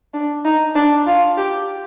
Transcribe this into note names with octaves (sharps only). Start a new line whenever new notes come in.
D4
D#4
D4
F4
G4